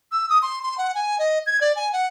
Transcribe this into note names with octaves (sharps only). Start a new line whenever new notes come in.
E6
D#6
C6
C6
F#5
G#5
D#5
G#6
D5
G#5
F#5